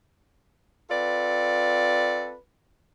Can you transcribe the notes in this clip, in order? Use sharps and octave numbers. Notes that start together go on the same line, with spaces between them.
C4 F4 A4 B4 D5